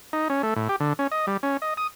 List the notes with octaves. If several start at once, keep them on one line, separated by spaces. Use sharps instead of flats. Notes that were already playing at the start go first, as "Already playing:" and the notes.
D#4
C#4
A3
A2
G4
D3
C#4
D#5
G3
C#4
D#5
D#6